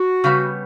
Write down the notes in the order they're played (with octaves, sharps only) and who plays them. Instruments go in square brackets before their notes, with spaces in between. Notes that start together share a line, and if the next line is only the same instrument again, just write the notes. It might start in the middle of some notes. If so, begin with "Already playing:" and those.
Already playing: [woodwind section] F#4
[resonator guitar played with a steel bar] C#3 G3 B3